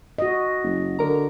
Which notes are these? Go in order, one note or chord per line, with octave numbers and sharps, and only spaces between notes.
F#4 D#5
F#1
D3 A#4 A#5